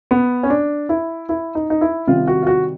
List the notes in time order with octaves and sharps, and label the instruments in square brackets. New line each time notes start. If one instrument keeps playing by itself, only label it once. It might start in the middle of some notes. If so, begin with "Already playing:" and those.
[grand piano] B3
C#4
D4
E4
E4
D#4
D#4
E4
C3 D#3 G3 F4
F#4
F4
F#4